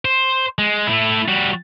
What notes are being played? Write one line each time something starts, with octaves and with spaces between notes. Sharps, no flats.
C5
G#3
A3 E4
G3 F#4